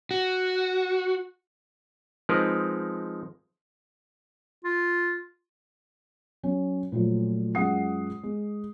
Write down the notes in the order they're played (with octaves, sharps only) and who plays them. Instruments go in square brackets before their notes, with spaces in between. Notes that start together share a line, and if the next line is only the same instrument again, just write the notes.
[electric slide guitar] F#4
[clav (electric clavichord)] F3 G#3 C4 D#4 A#4 B4
[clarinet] F4
[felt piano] F#3 C#4
A#2 F3 F#3 A3
F#2 G#3 F4 F#5 D#6 C7
G#3